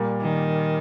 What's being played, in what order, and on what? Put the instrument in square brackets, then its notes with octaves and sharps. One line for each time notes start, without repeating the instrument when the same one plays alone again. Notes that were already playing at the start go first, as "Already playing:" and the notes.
Already playing: [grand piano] A#2 G3 A#3
[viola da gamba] D#3